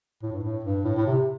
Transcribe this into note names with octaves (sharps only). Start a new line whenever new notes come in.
A2
G2
A2
G2
A2
A2
C3